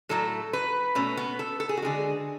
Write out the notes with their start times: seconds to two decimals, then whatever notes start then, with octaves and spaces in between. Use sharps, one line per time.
0.09 A2 F#3 A3 A4
0.53 B4
0.95 B2 A3 C#4
1.17 B3
1.39 A4
1.60 A4
1.69 G#4
1.77 F#4
1.82 D3 G#3 G#4